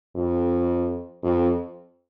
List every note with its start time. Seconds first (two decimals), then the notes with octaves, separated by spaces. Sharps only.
0.16 F2
1.23 F2